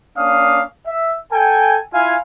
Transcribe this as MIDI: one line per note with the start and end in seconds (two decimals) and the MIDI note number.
0.18 0.62 58
0.18 0.62 61
0.18 0.62 62
0.18 0.62 77
0.18 0.62 87
0.87 1.15 76
1.32 1.79 69
1.32 1.79 79
1.32 1.79 80
1.93 2.16 64
1.93 2.16 65
1.93 2.16 77
1.93 2.16 80